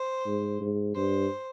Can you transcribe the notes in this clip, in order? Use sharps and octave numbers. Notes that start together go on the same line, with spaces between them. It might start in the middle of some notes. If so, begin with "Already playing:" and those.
Already playing: C5
G#2
G#2
G2 C5